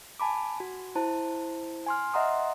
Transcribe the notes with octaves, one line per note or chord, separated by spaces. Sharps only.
G#5 A5 B5 D6
F#4
E4 C5 A5
G#5 C6 F6
D#5 E5 F#5 A#5 C6 D#6